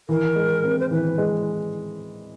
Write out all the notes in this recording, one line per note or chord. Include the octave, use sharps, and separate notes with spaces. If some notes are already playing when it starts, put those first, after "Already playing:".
E3 A#4
G#3
C4
C5
E3 B4
G#3